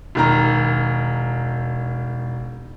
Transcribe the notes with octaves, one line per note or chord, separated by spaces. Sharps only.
E1 D#3 A#5